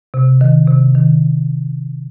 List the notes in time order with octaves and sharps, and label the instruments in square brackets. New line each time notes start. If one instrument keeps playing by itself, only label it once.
[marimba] C3
D#3
C3
D#3